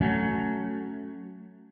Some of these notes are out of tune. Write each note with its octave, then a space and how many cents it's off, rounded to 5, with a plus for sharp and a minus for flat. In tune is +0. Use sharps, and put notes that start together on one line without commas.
F#3 +0 A3 +0 C#4 +10